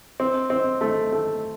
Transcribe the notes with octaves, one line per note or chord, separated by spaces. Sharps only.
C4
C4
A3
A3